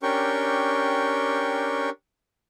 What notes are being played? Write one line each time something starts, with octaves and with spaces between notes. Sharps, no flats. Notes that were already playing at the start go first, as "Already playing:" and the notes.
C#4 D4 G4 A#4 G5 C#6